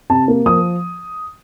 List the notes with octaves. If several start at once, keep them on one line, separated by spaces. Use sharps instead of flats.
C3 A5
A#3
F3 D#6